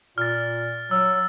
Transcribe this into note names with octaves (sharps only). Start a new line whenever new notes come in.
A#2 F6 A6
F#3 E6